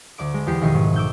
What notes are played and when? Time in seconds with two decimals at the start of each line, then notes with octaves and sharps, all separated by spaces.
0.18 D2 D5 D6 D7
0.34 G#3
0.47 E2 G4 C7 C#7
0.61 F1 B1 D#3 C#6 C7 D#7
0.74 G#2
0.96 D6 E6 G6